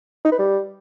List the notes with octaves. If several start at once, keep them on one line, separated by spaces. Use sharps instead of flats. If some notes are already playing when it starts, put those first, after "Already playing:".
D#4
B4
G3